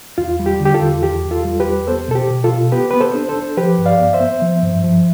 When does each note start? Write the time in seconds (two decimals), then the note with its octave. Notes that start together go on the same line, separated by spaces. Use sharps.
0.18 E2 F4
0.39 G3
0.46 G4
0.60 D3
0.65 G4
0.74 F4 A4
0.82 E2
1.03 E2 G4
1.24 E2
1.31 F4 A4
1.45 G3
1.60 G4 B4
1.66 E2
1.87 B3 A4 C5
2.08 B2 A4
2.15 G4
2.30 B2
2.44 F4 A4
2.52 B2
2.72 B3 G4 B4
2.91 B3 B4
3.01 A4 C5
3.15 D4
3.29 A4 C5
3.36 D4
3.57 F3 G4 B4
3.78 G2
3.85 D5 F5
3.99 B3
4.13 C5 E5
4.20 B3
4.42 F3
4.63 G2
4.84 F3